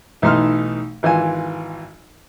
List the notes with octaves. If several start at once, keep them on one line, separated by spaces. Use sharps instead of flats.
B1 E3 A3 D#4 C6 F6
G#1 E3 F4 G#5